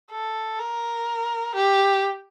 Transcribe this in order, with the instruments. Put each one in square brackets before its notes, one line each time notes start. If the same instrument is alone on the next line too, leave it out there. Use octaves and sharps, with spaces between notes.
[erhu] A4
A#4
G4